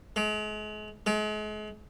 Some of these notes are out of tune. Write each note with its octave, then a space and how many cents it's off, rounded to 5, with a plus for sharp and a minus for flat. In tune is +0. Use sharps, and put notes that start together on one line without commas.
G#3 +40
G#3 +40